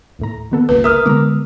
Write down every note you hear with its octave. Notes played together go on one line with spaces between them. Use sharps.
D#2 A2 A#5
D#3 B3 A4
G1 C#2 A#3 B4
A#4 E5 D#6 F6
D3 G#3 B3 A#5 D6